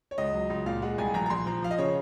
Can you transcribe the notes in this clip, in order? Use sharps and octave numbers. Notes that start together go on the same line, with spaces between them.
C#5
C#2 D#5
F#3
C#2
A#2 F5
G#3 F#5
C2 G#5
A#1 A#5
A#5
A#1 C6
F3 A#5
F3 F5
D#5
C#3 C#5